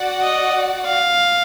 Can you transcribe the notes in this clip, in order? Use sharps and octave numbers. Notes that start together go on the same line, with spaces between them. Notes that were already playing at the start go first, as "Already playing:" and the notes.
Already playing: F#4 D5 F#5
D#5
F5